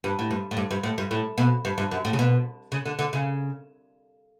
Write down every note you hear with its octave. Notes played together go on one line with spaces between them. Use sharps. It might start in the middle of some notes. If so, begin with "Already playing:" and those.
G2
A2
G2
A2
G2
G2
A2
G2
A2
B2
G2
G2
F#2
A2
C#3
B2
C#3
D3
D3
C#3